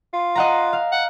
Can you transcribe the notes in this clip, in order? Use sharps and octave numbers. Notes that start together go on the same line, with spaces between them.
F4
D#5 F#5 A#5
F5
F#5